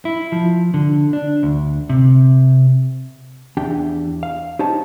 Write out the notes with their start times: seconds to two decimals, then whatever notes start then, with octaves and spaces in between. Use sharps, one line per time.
0.05 E4
0.32 F3
0.74 D3
1.13 D4
1.43 D2
1.89 C3
3.57 E2 D4 G4 G5
4.23 F5
4.59 D#4 G4 C5 C#5 A5